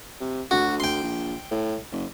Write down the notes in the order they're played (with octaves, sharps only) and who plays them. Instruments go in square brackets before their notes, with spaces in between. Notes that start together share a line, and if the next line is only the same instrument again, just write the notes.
[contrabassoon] C3
[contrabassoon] D2 [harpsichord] F#4
[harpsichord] G5 C6
[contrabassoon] A#1
A2
F#1